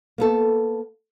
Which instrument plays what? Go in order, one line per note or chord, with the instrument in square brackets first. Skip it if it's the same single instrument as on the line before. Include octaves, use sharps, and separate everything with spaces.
[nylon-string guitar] A#3 B3 A4